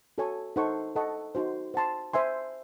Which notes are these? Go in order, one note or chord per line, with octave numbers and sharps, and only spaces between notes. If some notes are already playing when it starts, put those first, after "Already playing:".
F#4 A4 C#5 G#5 C#6
D#4 A4 C5 F#5 C#6
A4 D#5 F#5 A5 C#6
D#4 F#4 C5
C5 F#5 A5 C6
C5 E5 G#5 C6